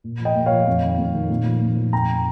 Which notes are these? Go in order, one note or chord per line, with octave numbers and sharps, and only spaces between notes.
A#2
F3
D#5 G5
A#2
C#5 F5
F3
F2
D#3
F2
D#3
A#2
F3
A#2
F3
F2 G5 A#5